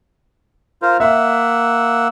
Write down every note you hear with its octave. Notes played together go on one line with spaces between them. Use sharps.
F4 A#4 C5
A#3 E5 F#5 E6